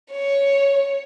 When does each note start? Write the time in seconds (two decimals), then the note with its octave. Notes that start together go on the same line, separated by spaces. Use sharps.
0.11 C#5